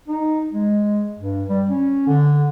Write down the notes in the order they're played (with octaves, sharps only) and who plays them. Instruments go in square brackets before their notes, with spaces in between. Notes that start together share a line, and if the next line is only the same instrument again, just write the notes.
[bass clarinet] D#4
G#3
G2
G3
C#4
D3